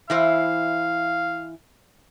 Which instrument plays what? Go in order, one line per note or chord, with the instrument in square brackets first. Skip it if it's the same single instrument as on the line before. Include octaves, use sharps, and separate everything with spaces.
[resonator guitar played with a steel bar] E3 E4 C5 [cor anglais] F5